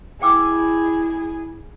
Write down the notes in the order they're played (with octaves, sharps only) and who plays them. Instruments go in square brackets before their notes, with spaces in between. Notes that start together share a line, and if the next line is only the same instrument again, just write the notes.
[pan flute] E4 [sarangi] G#4 [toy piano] G5 D6 E6